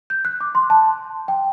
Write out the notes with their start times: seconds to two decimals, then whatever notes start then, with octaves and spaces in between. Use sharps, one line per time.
0.10 G6
0.25 F#6
0.41 D6
0.55 C6
0.70 A5
1.28 G5